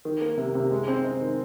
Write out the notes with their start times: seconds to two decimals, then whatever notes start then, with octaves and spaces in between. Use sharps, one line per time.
0.05 D#3
0.21 A#3
0.37 C3
0.55 C3
0.71 G#3
0.88 C4
1.04 D#4
1.21 D#3